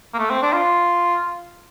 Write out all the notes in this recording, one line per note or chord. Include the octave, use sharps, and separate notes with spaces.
A#3
A3
C4
D4
F4